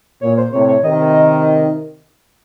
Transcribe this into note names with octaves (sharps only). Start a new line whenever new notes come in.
A#2 C#5
C5
A2 C3 C#5
C#5
C3 D#3 D#5